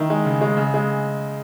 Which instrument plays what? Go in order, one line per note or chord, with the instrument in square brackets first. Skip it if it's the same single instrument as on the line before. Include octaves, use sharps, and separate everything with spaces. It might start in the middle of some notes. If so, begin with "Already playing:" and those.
Already playing: [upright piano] D#3 E4
G#3
C#3
G#3
C#3
G#3